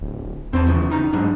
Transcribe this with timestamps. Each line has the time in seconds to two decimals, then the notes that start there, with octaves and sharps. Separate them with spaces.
0.01 D1
0.53 E2 C4 C5 A5
0.66 F#2 C#3 F3
0.91 C#3 D#4 A#5
1.13 G#2 F#3 D4